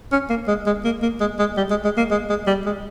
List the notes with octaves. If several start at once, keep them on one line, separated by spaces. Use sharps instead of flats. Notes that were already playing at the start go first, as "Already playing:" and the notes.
C#4
A#3
G#3
G#3
A#3
A#3
G#3
G#3
G3
G#3
G#3
A#3
G#3
G#3
G3
G#3